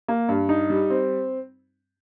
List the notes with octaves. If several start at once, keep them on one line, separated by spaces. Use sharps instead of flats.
A#3
G2
D#4
G3
C4